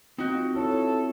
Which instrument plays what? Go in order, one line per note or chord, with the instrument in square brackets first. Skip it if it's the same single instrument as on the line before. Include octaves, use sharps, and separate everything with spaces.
[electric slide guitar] C4 G5 [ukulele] D#4 F#4 [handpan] F4
[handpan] E4 C#5 [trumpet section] A4